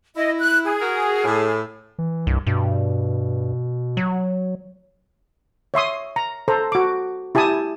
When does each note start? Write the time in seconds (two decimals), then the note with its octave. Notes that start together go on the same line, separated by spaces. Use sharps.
0.16 E4 D#5
0.40 F#6
0.65 G#4
0.80 F#4 A#4
1.25 A2
1.98 E3
2.27 C2 G2
2.47 G2 B2
3.97 F#3
5.74 C#5 E5 C6 D#6
6.16 A#5
6.48 A4 C5 A#5
6.72 F#4 D6
7.35 E4 G4 G#5 A5 D#6